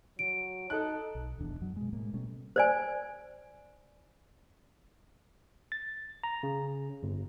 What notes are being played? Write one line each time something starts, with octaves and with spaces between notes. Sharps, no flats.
F#3 D7
D#4 A4 F#6
B1
D1 A#1 E2 D4
F#2 F#3
B2 G#3
A2 G#3 A#3
B2 G3 A3 C#4
C5 D5 G#5
A6
A#5
C#3
G1